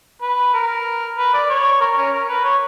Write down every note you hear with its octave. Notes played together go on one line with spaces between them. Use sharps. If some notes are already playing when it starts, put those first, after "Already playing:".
B4
A#4
B4
D5
C#5
A#4
C#4
A#4
B4
C#5